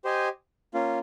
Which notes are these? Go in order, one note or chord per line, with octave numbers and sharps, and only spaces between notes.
G4 C5 D#5 G#5
A#3 C#4 F4